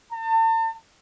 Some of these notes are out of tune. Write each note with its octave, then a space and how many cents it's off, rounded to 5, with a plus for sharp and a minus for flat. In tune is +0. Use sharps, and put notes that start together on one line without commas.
A5 +40